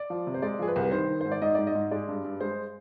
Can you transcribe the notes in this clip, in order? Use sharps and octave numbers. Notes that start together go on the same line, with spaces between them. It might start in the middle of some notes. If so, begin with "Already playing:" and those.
Already playing: D5
F3
C3
C5
G#3 D5
F3 G#4
B4
C2
B4
D#3 C5
D#3
G#2 C5
D5
G#2 D#5
G#2 D5
D#5
G#2
G#3 D5
G2
G2
G#3 C5